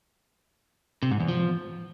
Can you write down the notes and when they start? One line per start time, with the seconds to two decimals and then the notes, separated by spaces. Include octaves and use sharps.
1.03 C3
1.11 G#2
1.20 E2
1.28 F3